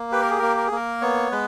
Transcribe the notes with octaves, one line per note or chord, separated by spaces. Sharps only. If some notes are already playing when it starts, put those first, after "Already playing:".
Already playing: A#3
G4 B4
A#4
G#4
A#3 A#4
A#4
G#4
A#3 A#4
B3 C#5
G#3 B4